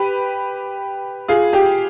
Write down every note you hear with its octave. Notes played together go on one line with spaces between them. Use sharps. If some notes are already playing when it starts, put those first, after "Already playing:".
Already playing: G4 B4
F4 G#4
G4